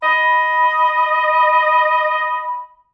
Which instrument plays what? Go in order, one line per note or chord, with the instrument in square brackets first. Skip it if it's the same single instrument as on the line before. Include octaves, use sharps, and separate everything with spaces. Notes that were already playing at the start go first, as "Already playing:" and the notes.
[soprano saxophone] D#5 [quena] B5